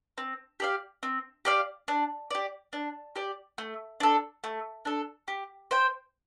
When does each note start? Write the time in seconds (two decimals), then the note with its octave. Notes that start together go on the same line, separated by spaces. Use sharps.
0.18 C4
0.60 G4 D5 F5
1.03 C4
1.45 G4 D5 F5
1.88 D4
2.31 G4 D5
2.73 D4
3.16 G4 D5
3.58 A3
4.00 D4 A4
4.44 A3
4.85 D4 A4
5.28 G4
5.71 C5 G5